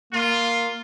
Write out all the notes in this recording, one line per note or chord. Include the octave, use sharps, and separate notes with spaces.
A#3 F4